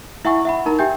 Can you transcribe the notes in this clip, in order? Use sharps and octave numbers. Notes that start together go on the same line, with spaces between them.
E4 E5 F#5 G#5 C#6
E5 F#5 B5
D#4 A#4 A#5
G4 E5 G5 G#5 G6